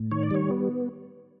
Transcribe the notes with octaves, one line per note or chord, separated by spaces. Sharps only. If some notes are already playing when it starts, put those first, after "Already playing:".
Already playing: A2
D#3 C#5
D5
G3 C#5
B3